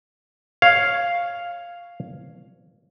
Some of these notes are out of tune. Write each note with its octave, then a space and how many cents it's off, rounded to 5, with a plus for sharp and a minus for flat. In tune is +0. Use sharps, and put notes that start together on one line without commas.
C#5 +0 F5 +0